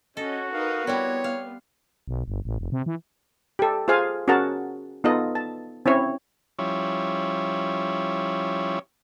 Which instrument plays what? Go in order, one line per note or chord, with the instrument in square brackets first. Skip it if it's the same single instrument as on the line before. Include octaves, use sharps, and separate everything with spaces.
[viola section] C#4 [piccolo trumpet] F#4 [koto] A4 [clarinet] D#5
[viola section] D#4 A#4 B4 [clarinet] F5
[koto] G3 C4 E4 [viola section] B3 [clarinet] C#5
[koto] F5
[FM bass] B1
G1
A1
F1
C3
E3
[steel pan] G4 A4
F4 G#4 C5 F5 G#5
C#4 F#4 G#4 A#4 F#5 A5
B3 D#4 F4 A4 D#5
A5
C4 C#4 E4 C#5
[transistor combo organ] F3 G3 C#4 E4 C#5